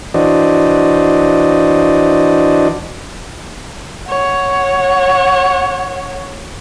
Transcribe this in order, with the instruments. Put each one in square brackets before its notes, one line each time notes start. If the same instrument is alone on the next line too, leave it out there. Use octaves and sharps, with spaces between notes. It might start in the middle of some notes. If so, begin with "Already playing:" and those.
[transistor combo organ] E3 D4 F#4 C5 D5 D#5
[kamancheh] C#5 F#5